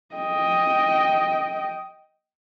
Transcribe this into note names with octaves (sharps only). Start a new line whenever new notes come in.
D#5 G5